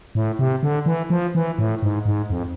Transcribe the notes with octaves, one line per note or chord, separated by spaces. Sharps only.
A2
C3
D3
E3
F3
E3
A2
G#2
G#2
F2